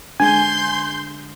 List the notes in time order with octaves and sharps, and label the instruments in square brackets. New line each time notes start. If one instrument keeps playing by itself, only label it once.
[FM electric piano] D3 G#3 [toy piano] D4 [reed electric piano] G#5 [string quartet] C6 G6